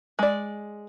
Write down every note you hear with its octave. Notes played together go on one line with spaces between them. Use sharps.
G#3 D5